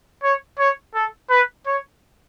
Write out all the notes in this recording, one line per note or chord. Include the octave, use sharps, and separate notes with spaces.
C#5
C#5
A4
B4
C#5